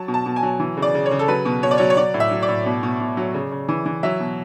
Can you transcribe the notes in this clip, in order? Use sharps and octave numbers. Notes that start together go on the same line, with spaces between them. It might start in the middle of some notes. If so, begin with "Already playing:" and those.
Already playing: F#3 A5
B2
A5
B2
G#5
F#3
E3
C#3
D5
C#3
C#5
C#3
A4
F#3 B4
B2
B2 C#5
D5
F#3 C#5
C#5
F#3 D5
A2
E5
F#3
D5
A2
B2
B2
B2
F#3
C#3
C#3
E3
E3
F#3 E5
B2